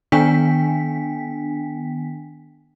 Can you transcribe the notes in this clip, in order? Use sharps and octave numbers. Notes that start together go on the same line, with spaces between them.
D#3 B3 D4 G5 G#5 B6